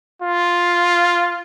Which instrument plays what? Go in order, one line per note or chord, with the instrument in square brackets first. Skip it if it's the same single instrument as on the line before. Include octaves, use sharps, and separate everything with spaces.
[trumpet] F4